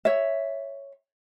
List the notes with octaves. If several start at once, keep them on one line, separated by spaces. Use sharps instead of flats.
C#5 E5